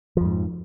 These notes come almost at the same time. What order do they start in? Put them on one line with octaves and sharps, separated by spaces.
F3 F2 G#2